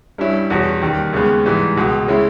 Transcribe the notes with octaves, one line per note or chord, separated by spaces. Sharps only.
G2 G3 C#4 E4
E2 B2 G3 C#4
D#2 D#3 G3
D#2 C#3 G#3 B3
G#2 E3 G3
C#2 B2 G#3
C#3 G#3 C#4 E4